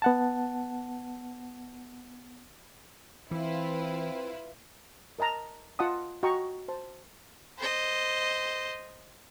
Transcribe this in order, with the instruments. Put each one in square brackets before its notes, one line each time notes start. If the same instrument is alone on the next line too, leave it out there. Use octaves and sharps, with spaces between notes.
[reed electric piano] B3 F#5 A5
[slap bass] E3 [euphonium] C4 [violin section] E4 F4 B4
[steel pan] A#4 D#5 A5 A#5
F4 D#5 F#5 A5 D#6
F#4 D#5 F#5 G5 A#5 C#6
C5 A5
[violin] C5 D#5